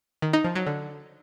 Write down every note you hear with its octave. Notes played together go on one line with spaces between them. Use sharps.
D#3
D#4
F3
F#3
D3